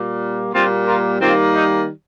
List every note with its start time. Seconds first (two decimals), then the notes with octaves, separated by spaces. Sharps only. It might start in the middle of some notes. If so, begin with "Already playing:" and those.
Already playing: A#2 G3 A#3
0.53 A#2 G3 A#3 C4 F4
0.87 F4 A#4
1.21 D#3 G3 A#3 C4 F4
1.55 D#4